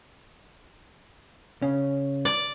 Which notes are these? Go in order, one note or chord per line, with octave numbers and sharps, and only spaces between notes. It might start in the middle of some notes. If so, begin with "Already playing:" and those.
C#3 C#4
D5